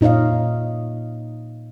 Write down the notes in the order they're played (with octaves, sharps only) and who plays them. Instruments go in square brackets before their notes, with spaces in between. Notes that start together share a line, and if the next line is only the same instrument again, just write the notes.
[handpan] A#2 D#4 C#5 D#5 F5